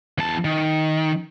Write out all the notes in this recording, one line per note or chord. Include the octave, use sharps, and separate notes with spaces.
E2 A5
D#3